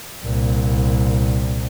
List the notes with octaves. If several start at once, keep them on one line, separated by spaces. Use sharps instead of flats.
C2 A#2